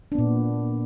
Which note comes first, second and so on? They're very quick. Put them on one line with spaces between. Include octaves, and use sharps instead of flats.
D4 B3 A#2